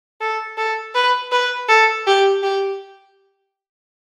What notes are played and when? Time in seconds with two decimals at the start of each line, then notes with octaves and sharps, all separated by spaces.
0.21 A4
0.57 A4
0.95 B4
1.32 B4
1.69 A4
2.07 G4
2.43 G4